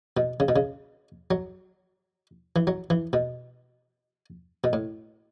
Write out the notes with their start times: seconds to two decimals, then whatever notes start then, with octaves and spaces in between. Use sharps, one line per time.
0.17 B2
0.40 C#3
0.48 B2
0.56 C#3
1.31 F#3
2.56 E3
2.67 F#3
2.90 E3
3.13 B2
4.64 B2
4.73 A2